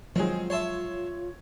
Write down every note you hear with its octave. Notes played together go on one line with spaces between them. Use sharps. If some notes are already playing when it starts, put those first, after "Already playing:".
D#3 F3 F#3 G#3 C4 F4 G#4
C#5 E5 A5 C6